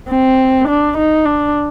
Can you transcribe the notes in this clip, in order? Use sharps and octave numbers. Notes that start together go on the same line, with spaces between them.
C4
D4
D#4
D4